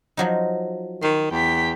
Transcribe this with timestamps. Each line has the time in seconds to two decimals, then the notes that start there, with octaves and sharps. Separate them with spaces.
0.17 F3 F#3 D#4
1.02 D#3 C6
1.31 E2 G5 B6